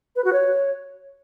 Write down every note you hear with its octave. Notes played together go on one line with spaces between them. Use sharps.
B4
F#4
C#5